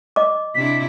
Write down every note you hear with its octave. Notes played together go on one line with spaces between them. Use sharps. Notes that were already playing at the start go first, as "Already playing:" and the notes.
D#5 D6
C3 D4 E4 B6